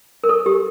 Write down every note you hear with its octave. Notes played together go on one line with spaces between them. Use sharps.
A#4
A4
G4